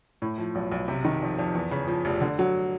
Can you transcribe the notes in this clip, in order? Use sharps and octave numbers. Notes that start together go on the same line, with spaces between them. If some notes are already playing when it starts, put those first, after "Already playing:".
A2
F3
B1
B1
C3
D#3
F2
F2
E2
C#3
F3
F1
D3
F#3